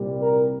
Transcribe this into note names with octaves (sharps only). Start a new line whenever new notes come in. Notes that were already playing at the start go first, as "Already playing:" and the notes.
Already playing: C2 A#2 G3
A#4